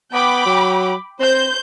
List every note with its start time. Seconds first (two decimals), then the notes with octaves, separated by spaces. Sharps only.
0.13 B3 G5 B5 D6
0.46 F#3
1.20 C4 C5 G6